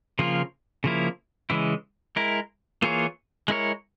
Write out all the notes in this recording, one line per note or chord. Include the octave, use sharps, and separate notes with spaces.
C#3 F3 A#3 F4
C#3 F3 A#3 E4
C#3 E3 G#3 E4
G#3 E4 A#4
E3 A#3 F4 G#4 C#5
G#3 E4 A#4 C#5